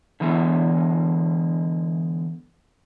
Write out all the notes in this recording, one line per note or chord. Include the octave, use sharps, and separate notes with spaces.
D3 E3 G#3 B3